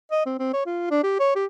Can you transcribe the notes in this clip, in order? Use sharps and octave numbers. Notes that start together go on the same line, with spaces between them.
D#5
C4
C4
C#5
F4
D4
G4
C#5
G4